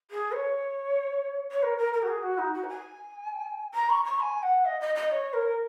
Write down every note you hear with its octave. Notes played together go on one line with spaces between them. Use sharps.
G#4
C#5
C#5
A#4
A#4
A#4
F#4
G#4
F#4
D#4
F#4
A#5
G#5
A#5
C#6
C#6
G#5
F#5
D#5
D#5
D#5
C#5
A#4